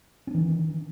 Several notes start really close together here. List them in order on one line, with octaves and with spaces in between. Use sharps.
C#4 D4 E3 D#3